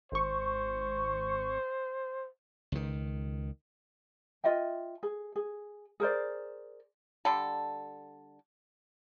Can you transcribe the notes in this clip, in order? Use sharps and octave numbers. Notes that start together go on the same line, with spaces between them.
G#1 C5 C#6
C#2 D#3
F4 D#5 E5 G5
G#4
G#4
G#4 A#4 C5 D5
D3 G3 A4